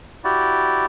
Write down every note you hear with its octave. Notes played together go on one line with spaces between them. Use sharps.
E4 F#4 G4 D5